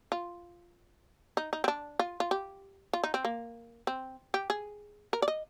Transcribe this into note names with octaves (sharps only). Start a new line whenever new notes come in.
F4
D#4
D#4
C4
D4
F4
F4
G4
F4
D#4
C4
A#3
C4
G4
G#4
A#4
D5
D#5